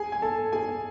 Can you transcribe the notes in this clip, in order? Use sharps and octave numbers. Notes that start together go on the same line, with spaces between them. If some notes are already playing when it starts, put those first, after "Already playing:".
Already playing: G#4 G#5
G#5
A4 A5
G#4 G#5